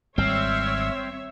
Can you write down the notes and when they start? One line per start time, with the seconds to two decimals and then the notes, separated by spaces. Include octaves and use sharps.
0.18 G#1 G3 C4 C#5 E5 F6